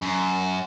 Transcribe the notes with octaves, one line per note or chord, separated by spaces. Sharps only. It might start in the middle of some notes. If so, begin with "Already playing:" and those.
F#2